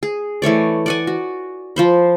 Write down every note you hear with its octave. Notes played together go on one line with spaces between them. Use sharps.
G#4
E3 A3 C#5 D5
D5 F#5 G#5
F#4
F3 C5 B5